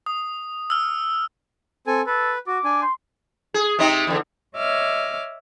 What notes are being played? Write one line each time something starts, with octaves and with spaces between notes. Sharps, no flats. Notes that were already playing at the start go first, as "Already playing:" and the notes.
D#6
E6 F6
C4 A4 G#5
A4 B4
F#4 D6
D4 G#5
C6
G#4
C3 C4 D#4
E2 D3
C#5 D#5 E5 D6 F6